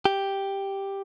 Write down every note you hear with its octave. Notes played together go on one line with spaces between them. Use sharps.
G4